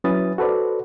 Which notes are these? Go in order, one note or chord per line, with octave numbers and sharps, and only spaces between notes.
F#3 C#4 E4 B4 D#6 A6
F#4 A4 B4 C5 D5